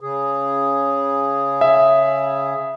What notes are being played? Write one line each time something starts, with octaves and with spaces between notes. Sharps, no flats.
C#3 G#4
E5